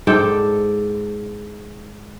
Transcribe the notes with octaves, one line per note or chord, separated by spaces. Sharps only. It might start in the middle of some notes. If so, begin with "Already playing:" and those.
G#2 A4 D5 G5